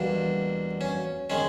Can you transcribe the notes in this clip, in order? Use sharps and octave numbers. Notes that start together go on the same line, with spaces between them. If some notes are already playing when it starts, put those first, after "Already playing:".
Already playing: E2 B2 G3 A#3 D4
C#4
D#3 G#3 C#4